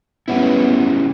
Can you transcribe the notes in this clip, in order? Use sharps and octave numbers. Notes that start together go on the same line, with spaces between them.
G3 B3 C#4 E4